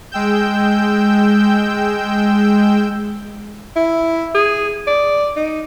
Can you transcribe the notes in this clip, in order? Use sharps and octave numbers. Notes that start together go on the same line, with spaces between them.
G#3 G5 E6 G6
E4
G#4
D5
D#4